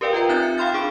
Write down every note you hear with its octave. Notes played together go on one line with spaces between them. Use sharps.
G4 A#4 B4 D5 F5 G5
F4 A#4 B4 E5 G5 A#5
C4 D#4 E5 F#6 G6 A6
C#7
F5 G5 B5 C6 F6 A6
D4 G#4 D6 D7